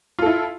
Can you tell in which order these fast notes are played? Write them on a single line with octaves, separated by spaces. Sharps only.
F4 A4 E4